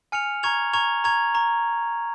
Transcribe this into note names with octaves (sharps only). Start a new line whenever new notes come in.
G#5 F6 C#7 F7
A#5 C#6 G#6 F7
A#5 C#6 G#6 F7
A#5 C#6 G#6 F7
A#5 C#6